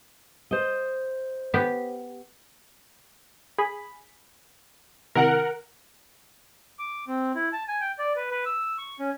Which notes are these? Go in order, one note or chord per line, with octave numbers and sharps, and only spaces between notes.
C5 D#5
B3 G4
G#4 B5
C3 D#3 E4 A#4 F#5
D6
C4
E4
A5
G#5
G5
D5
B4
B4
E6
C#6
C#4